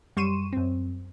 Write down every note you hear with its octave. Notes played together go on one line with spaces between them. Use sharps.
F#2 G3 C6 C#6 D#7 E7
F#2 C4